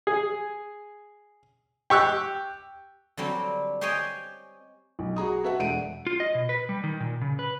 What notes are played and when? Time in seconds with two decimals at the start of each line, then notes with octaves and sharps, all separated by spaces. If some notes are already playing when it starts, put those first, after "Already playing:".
0.07 G#4
1.90 G4 C#6 E6 F#6
3.17 D3 F#3 G3 C4
3.81 G4 C5 C#5 D#5 G5 G#5
4.99 B1
5.16 F#4 G#4 A#5 D#6
5.44 F#4 A4 B4 E5 F#5
5.59 E1 F#5 D7 D#7
6.07 F4
6.20 D#5
6.35 B2
6.49 B4
6.69 G3
6.84 D#3
7.00 A#2
7.21 C#3
7.39 B4